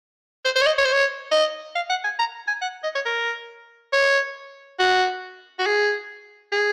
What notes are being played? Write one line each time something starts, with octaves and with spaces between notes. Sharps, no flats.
C5
C5
C#5
D#5
C#5
C5
C#5
D#5
F5
F#5
G#5
A#5
G#5
F#5
D#5
C#5
A#4
C#5
F#4
F#4
G#4
G#4